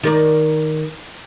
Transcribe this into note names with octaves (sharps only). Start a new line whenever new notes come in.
D#3 A#4 D5